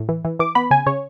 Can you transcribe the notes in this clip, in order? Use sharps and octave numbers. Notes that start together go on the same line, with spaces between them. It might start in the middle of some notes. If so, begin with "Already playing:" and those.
Already playing: A2
E3
E3
E3 D6
B3 B5
C#3 G#5
C#3 C#5